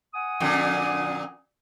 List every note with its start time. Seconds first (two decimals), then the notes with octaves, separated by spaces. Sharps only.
0.14 F#5 G#5 D#6
0.40 F2 A#2 D3